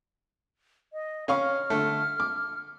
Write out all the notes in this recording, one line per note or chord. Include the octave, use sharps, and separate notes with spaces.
D#5
C#4 F5 B5 C#6
F6
D3 A3
D6